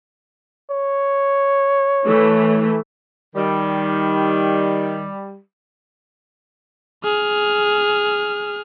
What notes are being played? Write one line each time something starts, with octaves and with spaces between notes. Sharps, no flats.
C#5
E3 A3
D#3 G3
G#4 F6